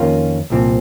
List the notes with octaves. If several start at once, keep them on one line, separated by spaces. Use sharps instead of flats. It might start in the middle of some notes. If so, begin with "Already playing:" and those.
Already playing: F2 D#3 A#3 C#4 F4
C2 A#2 F3 C4